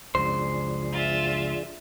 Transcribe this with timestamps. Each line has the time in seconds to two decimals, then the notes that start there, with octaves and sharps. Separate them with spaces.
0.15 C#2 F#2 F3 D4 G#4 C5
0.92 F4 E5